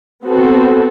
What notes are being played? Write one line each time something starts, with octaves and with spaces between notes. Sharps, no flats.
B3 C4 F#4 A4